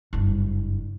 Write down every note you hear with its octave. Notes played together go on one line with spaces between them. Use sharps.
F#1 G2